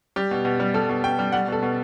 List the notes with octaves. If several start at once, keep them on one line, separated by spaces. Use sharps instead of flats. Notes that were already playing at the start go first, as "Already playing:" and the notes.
G3 G4
B2
B2
G3
G3 A4
B2
B2 G5
G3
G3 F#5
B2 A4
B2